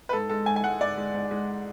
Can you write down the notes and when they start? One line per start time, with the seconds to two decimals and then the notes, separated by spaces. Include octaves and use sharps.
0.09 B4
0.13 G#2 A4
0.29 G#3 A4
0.46 G#2 G#5
0.56 G#5
0.63 G#3 F#5
0.80 G#2 D5
0.97 G#3
1.14 G#2
1.31 G#3